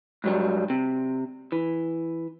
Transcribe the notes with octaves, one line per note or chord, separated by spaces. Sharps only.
G#2 F#3 G3
C3
E3